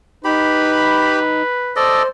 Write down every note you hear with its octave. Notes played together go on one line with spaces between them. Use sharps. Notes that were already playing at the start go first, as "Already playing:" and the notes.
D#4 G4 B4 B5
A4 C5 D5 D#5